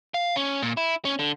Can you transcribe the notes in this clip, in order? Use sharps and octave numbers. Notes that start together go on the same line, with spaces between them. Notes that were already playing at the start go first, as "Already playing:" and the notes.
F5
C#4
A#2
E4
C#4
D3